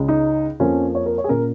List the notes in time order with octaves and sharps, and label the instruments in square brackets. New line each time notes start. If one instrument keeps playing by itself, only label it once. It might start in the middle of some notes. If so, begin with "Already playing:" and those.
Already playing: [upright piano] C#2 C#3 G#3
[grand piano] D#4
[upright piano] F2 F3 A#3 [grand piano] C#4
[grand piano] C#5
A#4
C#5
G#4
[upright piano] A#2 A#3 C#4 [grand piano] A#4